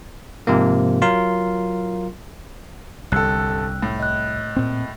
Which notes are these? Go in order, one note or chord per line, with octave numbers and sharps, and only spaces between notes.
G#2 C3 F3 A#3
F#3 F4 A#4 C6
G1 C2 A4 G5 E6 F#6
A2
D#5 F#6
A#2 C4